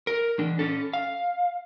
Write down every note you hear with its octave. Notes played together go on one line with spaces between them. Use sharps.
A#4
E3 D4
C#4 A4
F5